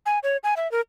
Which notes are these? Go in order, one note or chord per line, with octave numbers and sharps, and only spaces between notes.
G#5
C#5
G#5
E5
A#4